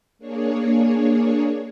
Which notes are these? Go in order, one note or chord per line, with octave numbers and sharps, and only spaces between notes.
A#3 D4 G#4 C#5